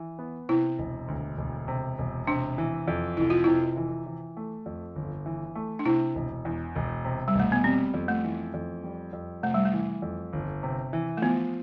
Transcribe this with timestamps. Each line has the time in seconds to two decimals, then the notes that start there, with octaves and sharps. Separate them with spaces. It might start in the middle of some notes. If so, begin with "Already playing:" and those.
Already playing: E3
0.19 B3
0.49 C3 E4
0.78 E1
1.08 D2
1.38 E1
1.68 C3
1.98 E1
2.27 C3 D4
2.58 E3
2.88 F2
3.17 F1 E4
3.30 F4
3.44 C3 E4
3.77 E3
4.06 E3
4.37 A3
4.66 F2
4.96 G1
5.26 E3
5.55 A3
5.79 D4
5.85 C3 E4
6.15 E1
6.45 E2
6.75 E1
7.05 C3
7.28 G3
7.35 E1
7.40 A3
7.52 B3
7.64 G3 C4
7.94 F2
8.08 A3
8.24 E3
8.54 F2
8.83 G3
9.13 F2
9.43 C3 A3
9.54 G3
9.65 A3
9.73 E3
10.02 F2
10.33 G1
10.63 C3
10.93 E3
11.17 A3
11.22 F3 B3